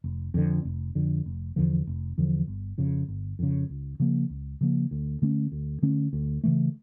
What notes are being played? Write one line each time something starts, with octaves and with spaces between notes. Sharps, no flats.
F1
F2 D3
F1
F2 D3
F1
E2 D3 F3
F1
E2 D3 F3
G1
F2 C#3
G1
F2 C#3
C#2
C#3 F3 A#3
C#2
C#3 F3 A#3
D2
D3 A3 C#4
D2
D3 A3 C#4
D2
C#3 E3 A3